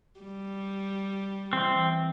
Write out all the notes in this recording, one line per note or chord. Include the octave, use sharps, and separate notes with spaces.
G3
E3 C4